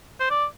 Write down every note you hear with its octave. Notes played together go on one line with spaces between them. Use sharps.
C5
D5